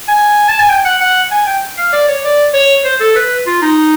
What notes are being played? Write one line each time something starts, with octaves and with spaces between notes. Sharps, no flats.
G#5
A5
G#5
G5
F#5
F#5
G#5
G5
F5
D5
C#5
D5
C#5
C5
A4
B4
F4
D#4